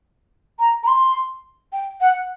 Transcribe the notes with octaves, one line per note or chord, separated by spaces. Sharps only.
A#5
A#5
C6
G5
F#5